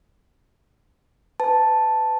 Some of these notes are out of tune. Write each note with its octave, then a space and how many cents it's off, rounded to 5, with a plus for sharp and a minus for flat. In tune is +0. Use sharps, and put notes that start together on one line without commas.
B4 +30 A5 +0